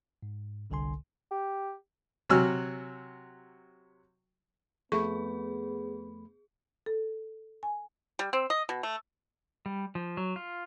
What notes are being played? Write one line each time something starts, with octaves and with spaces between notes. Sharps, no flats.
G#2
G1 C2 D3 A4 G#5 C6
G4
C3 F#3 F#4 G#5 E6 F6
F2 A3 B3 G#4 B5 C#6
A4
G#5
G3
C4
D#5
B2
A3
G3
F3
F#3
F4